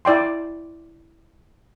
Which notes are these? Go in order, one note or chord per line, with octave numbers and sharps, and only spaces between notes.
E4 D5 G5 C6